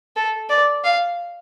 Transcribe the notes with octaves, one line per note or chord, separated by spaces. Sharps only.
A4
D5
F5